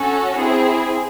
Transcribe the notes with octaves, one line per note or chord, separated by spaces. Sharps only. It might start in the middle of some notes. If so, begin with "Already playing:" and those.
Already playing: C#4 F#4 A4
C4 E4 G#4